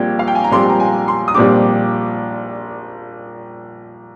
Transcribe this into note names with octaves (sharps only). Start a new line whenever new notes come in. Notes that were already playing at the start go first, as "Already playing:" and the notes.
Already playing: A#1 A#2 G3 C4 G4 G#6
F5
G5
G#5
A#5
A#1 A#2 G3 C4 G4 C6
A#5
G#5
C6
D#6
A#1 A#2 G3 C4 G4 D6